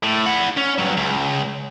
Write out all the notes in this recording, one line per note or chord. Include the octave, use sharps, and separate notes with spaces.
A2
E4 F#5
C#4
G2 F#3
C#2